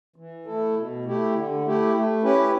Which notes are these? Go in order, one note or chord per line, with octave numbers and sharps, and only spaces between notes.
E3
A3 E4 A4
B2
A3 E4 G4
D3
A3 E4 G4
A3
C#4 E4 G4 B4